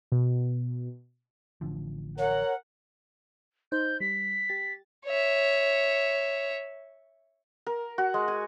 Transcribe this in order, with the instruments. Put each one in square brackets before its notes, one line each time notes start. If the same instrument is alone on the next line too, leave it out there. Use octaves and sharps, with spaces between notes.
[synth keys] B2
[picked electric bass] A1 D3 F3
[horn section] A#4 F#5 [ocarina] C#5
[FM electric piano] D#4 C5 [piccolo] G6
[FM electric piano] G3 [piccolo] B6
[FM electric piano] G4 A6
[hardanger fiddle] C#5 E5
[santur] A#4
F#4
G#3
G#5